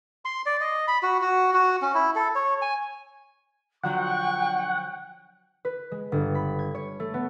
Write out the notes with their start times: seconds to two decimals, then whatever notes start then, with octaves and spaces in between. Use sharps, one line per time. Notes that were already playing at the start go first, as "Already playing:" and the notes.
0.25 C6
0.46 D5
0.61 D#5
0.88 B5
1.03 F#4
1.21 F#4
1.54 F#4
1.82 C#4
1.95 E4
2.15 A4
2.35 C#5
2.62 G#5
3.84 D3 F3 F#3 F#5 G5 C#6
5.65 B4
5.91 G#3
6.12 G1
6.35 B5
6.59 G#6
6.75 C#5
7.00 A3
7.14 B3